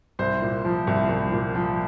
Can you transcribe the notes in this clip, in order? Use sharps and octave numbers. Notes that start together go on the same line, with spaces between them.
C2 C5
A#2
F3
C2
C2
A#2
F3